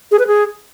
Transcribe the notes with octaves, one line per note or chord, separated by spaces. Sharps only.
G#4
B4
G#4